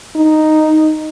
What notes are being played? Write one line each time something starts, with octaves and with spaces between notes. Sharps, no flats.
D#4